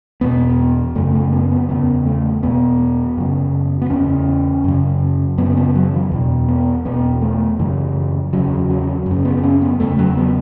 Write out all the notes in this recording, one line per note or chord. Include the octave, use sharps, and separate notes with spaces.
E2 B2 B3
F#2 C#3 A3
A3
B3
B3
E2 C#3 B3
A3
E2 B2 B3
F#2 C#3
B3
E2 C#3 C#4
F#2 C#3
F#2 C#3 B3
B3
F#3
E3
E2 B2
B3
E2 B2 B3
A3
F#2 C#3 E3
E2 C#3 F#3
F#3
F#2 C#3
B3
C#4
B3
E2 C#3 A3
F#3
B3